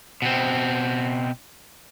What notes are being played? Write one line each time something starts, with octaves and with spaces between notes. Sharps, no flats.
B2 C4